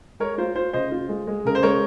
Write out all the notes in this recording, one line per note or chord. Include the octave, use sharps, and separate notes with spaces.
G#3 A#4 C#5
F4 C5
F4 C5
C#3 C5 D#5
F4
G#3
G#3
C#3 A#4
C5
G#3 A#4 C#5